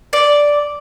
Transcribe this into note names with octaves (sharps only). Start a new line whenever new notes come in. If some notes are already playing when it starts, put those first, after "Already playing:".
D5